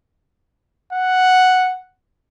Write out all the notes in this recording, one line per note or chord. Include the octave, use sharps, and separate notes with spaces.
F#5